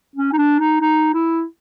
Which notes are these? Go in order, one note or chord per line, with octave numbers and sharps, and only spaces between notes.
C#4
D#4
D4
D#4
D#4
E4